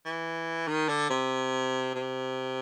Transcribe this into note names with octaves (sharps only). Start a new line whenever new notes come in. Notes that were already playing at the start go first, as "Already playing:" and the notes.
E3
D#3
D3
C3
C3